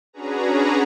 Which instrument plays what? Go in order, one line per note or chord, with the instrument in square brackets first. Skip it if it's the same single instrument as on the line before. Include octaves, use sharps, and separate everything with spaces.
[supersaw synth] C#4 D4 F#4 G#4 B4 A#5